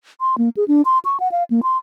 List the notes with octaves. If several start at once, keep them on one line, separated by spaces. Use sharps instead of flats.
C6
A#3
G#4
D4
C6
C#6
F#5
F5
A#3
C6